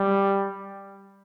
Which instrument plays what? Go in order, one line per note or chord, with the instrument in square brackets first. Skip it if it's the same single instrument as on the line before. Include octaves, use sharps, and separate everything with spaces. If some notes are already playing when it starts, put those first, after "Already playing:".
Already playing: [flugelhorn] G3